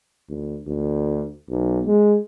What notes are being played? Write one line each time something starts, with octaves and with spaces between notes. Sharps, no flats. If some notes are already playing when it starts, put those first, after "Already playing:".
D2
D2
B1
G#3